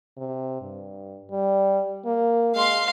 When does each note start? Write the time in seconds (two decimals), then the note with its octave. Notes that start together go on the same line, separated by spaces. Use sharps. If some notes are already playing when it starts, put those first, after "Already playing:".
0.17 C3
0.61 G2
1.31 G3
2.06 A#3
2.55 G#3 F5 C6